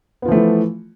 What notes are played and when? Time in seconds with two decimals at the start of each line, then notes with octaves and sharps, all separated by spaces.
0.22 B3
0.25 F4
0.29 F3
0.32 A3
0.35 E3